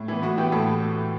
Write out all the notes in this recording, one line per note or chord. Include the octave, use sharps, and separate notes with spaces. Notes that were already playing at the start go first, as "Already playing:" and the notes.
Already playing: A2
E3 B3
A2 F#4
E3 B3 G4
A2 A4